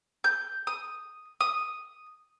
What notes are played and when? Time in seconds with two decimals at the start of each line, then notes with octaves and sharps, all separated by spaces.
0.24 G6
0.67 D#6
1.41 D#6